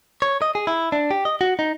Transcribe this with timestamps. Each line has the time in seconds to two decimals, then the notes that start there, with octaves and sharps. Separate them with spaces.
0.22 C#5
0.42 D#5
0.55 G#4
0.67 E4
0.92 D4
1.11 G4
1.25 D#5
1.41 F#4
1.59 D#4